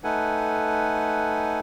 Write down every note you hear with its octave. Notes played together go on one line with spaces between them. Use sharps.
A3 D#4 A4 B4 F#5 G#5